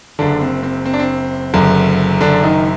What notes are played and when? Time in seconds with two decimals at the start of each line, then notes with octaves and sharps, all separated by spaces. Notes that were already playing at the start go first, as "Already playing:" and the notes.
0.19 F#1 F#2 D3 D4
0.41 C4
0.63 C4
0.85 C4
0.93 D4
0.99 C4
1.54 F#1 F#2 D3
2.21 D3 D4
2.43 D#3 D#4